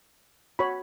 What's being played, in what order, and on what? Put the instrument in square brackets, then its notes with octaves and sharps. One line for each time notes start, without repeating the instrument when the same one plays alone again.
[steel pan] F#4 C#5 B5